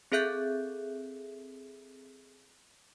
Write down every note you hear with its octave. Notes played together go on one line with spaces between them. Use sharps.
C4 G#4 A4 E5 F#6 G6